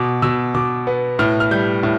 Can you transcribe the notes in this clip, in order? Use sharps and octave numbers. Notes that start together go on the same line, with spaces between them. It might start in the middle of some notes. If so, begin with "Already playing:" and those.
Already playing: B2 D6
B2 E6
B2 D6
B3
A2 F6
F6
G3 G6
A2